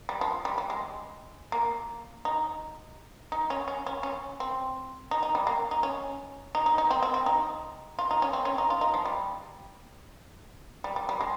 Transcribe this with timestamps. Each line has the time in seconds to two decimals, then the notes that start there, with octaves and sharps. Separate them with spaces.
0.09 G3
0.21 F3
0.45 G3
0.58 G3
0.70 G#3
1.52 A#3
2.25 D#4
3.32 D#4
3.50 C#4
3.68 C#4
3.86 C#4
4.03 C#4
4.40 C4
5.11 D#4
5.23 D#4
5.35 G3
5.47 A#3
5.71 D#4
5.83 C#4
6.55 D#4
6.66 D#4
6.78 D#4
6.91 C4
7.03 C4
7.14 C4
7.26 D#4
7.99 F4
8.11 D#4
8.22 C#4
8.33 C4
8.45 C#4
8.58 D#4
8.70 F4
8.81 D#4
8.94 F3
9.05 G3
10.84 G3
10.96 G3
11.09 G3
11.21 G#3